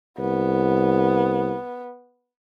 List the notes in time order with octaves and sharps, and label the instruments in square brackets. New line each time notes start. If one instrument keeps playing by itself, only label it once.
[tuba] C2 [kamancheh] B3